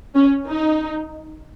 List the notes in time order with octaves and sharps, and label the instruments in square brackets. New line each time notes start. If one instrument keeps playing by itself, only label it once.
[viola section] C#4
D#4